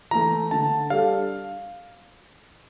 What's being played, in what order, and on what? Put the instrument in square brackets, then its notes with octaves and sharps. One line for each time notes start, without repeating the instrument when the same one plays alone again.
[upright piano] E3 A3 [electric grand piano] A#5
[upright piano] D3 [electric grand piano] A5
[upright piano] G3 D4 A4 [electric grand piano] F5